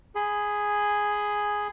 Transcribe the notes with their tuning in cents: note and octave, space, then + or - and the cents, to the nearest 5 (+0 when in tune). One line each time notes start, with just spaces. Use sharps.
G#4 +0 B5 +25